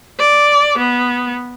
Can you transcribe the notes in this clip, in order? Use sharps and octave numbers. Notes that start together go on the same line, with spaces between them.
D5
B3